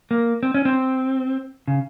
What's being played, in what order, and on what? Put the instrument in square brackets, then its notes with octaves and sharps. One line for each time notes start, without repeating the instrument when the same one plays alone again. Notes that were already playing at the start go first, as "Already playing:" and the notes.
[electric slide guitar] A#3
C4
C#4
C4
C#3